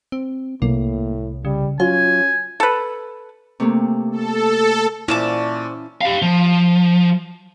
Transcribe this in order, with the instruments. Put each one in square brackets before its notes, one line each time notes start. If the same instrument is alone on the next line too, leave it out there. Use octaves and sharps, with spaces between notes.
[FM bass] C4
[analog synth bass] C2 [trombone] A2 [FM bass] A#3
[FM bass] C#3 [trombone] G3
[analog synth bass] F#3 [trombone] C#4 [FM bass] F4 [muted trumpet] G#5
[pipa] A4 B4
[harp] C3 A3 A#3
[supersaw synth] A4
[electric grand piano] A#2 [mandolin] C#4 A5 D6 [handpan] E4 [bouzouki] C5 D5 F5
[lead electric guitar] G4 F5
F3